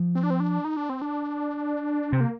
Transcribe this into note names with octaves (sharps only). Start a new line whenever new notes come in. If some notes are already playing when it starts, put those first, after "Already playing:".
Already playing: F3
C4
D4
C4
D4
D#4
D4
C4
D4
C3 C4
A#3